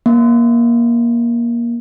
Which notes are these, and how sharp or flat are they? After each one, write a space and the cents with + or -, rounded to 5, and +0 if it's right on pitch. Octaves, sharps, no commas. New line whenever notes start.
A#3 +20